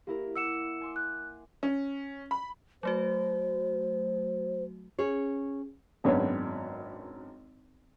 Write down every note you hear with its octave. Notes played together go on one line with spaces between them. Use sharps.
A#3 E4 G4 A#4
E5 F#5 D6 E6 C#7 E7
G#5 C6 D6
F#6
C#4
B5
F#3 A3 F#4 C5
C#4 G#4 C#5
G#1 F#2 B3 D4 C#5